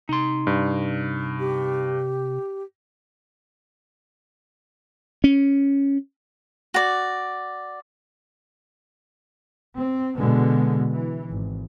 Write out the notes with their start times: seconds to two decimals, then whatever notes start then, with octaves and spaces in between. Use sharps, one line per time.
0.09 C3 D#4 C6
0.47 G2
1.40 G4
5.24 C#4
6.74 F#4 D5
9.77 C4
10.18 B2 D3 G#3 B3
10.91 E3
11.30 G#1